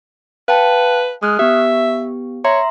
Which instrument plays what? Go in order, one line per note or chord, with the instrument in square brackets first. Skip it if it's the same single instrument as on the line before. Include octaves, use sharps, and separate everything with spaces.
[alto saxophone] B4 [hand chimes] F5 G5 A5
[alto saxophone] G#3 [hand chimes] D#6 F6 F#6
[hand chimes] B3 G4 [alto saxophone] E5
[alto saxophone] C#5 [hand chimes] E5 A#5 C6